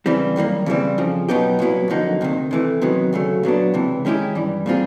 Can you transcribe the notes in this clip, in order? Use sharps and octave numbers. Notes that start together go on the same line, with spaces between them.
E2 C#3 E3 G3 C4
F#2 D#3 G3 A#3
C#3 E3 G3 C4
F2 C#3 F3
B2 F#3 B3 D#4 G4
C2 A#2 F#3 B3 E4
F2 D3 F#3 A#3 D#4
D2 C3 D#3
C3 E3 A3
C3 D#3 F#3 B3
D2 C#3 F#3 A3
A#2 F#3 B3 D4
C#2 C3 E3
D#3 G#3 C#4 E4 G4
G2 E3 G3
A#2 G3 C4 F4 G#4